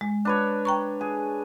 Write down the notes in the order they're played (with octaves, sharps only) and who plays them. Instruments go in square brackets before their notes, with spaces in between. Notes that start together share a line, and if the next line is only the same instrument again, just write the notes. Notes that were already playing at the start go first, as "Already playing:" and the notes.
[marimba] G#3
[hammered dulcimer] D4 B4 C#5
[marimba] G5 A#5 C#6
[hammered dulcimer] G#4